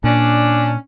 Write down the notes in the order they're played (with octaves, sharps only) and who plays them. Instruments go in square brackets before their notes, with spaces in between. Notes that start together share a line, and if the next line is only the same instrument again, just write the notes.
[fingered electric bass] A#2 [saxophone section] C#4 D4